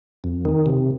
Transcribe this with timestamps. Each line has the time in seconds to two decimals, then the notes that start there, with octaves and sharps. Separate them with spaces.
0.24 F2
0.45 D#3
0.66 C3